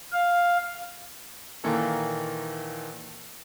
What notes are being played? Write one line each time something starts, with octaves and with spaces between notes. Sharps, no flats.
F5
A#2 D#3 E3 A#3 A4